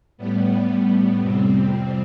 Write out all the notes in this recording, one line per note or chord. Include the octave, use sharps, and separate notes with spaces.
A2 G3 B3
F2 C3 G3 C4